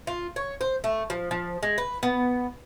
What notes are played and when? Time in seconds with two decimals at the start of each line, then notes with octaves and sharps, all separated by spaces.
0.07 F4
0.36 C#5
0.61 C5
0.84 A3
1.10 F3
1.31 F3
1.63 G#3
1.78 B4
2.03 B3